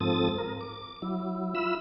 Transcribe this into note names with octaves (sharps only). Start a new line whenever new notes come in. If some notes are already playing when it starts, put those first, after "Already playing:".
G#2 F3 C4 A4 D#6 A6
A#4
D6
F#3 E4
F4 E5 B5 E6